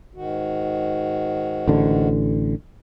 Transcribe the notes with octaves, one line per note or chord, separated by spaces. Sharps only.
G#2 D#3 F#4
A1 D3